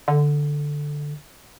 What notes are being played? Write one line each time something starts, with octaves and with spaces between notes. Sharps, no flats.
D3